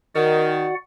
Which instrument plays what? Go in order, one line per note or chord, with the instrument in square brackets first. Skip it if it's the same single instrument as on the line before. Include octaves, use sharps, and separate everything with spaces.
[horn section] D#3 [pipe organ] F#4 D5 F#5